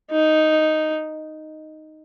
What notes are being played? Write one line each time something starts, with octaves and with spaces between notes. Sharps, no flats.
D#4